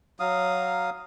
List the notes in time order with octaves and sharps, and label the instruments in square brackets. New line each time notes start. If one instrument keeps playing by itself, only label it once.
[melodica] F#3 F5 D#6